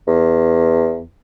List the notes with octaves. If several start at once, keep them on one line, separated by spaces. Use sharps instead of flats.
E2